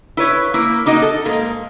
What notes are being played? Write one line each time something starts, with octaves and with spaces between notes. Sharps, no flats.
E4 B4 C#5
A#3 E4
A#3 D#4 F#4 D#5
A4
G#2 A#3